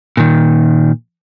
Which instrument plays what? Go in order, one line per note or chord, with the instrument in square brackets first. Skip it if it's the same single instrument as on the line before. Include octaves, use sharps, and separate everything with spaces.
[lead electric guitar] A#2 D#3